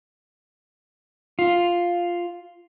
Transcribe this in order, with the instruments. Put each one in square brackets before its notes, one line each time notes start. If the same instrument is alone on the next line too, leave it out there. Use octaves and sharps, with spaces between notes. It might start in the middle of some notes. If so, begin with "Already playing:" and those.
[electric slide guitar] F4